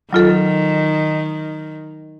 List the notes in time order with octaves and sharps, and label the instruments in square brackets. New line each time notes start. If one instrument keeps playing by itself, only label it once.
[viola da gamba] D#3 [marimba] F#3 F4 A4